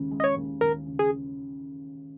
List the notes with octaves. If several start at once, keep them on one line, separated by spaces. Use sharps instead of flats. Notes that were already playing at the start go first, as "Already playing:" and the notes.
Already playing: D#2 C#3 G#3
G#3
D#5
C#5
D#2
D#2 A#4
C#3
G#4